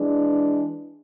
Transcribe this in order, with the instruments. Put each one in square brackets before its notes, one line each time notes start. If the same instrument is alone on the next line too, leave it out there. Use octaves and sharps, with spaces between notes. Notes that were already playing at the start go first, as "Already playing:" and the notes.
Already playing: [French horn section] E3 G#3 D4